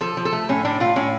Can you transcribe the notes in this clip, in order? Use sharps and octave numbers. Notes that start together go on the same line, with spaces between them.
F3 A4
F3
A4
A3
A2 C#4
A2 D4
A2 F4
A2 C#4